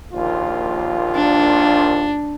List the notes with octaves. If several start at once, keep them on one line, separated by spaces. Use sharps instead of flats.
A#1 D#2 F4
D4